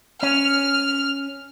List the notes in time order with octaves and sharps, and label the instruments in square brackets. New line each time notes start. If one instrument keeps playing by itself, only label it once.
[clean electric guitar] C#4 [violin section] F6